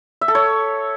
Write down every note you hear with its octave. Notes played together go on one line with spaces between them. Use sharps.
E5
A4
C#5